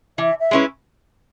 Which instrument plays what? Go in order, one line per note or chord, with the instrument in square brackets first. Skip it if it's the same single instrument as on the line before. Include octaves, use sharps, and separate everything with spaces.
[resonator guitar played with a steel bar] E3 [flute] E5
[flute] E5
[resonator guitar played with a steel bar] G#3 C#4 E4 B4